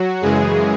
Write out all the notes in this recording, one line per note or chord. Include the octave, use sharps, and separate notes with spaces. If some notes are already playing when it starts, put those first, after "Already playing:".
Already playing: F#3 F#4
F#2 C#3 E3 G#3 G#4